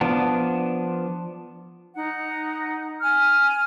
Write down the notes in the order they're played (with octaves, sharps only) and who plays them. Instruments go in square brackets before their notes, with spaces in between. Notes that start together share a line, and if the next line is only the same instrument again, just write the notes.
[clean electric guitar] F3 B3 D4
[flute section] D#4 F#5
G#5 F6